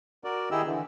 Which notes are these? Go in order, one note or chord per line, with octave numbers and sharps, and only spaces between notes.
F#4 A#4 D5
D#3 E4 G4 G#4 D#5 E6
D3 E3